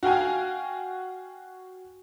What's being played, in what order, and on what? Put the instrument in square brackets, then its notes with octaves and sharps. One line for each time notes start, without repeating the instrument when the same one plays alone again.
[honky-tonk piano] F#4 F5 G5 G#5